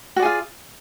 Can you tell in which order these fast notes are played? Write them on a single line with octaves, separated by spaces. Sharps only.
F#4 D5 G#4 F4